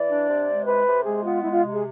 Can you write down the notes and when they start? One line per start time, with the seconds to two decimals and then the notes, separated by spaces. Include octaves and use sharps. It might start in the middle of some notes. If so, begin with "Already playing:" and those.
Already playing: E3 D5
0.08 D4
0.28 C3
0.47 G#3
0.66 C3 B4
0.86 C3
1.05 G#3 G#4
1.24 B3 F4
1.43 G#3 E4
1.53 F4
1.63 C3
1.73 G#4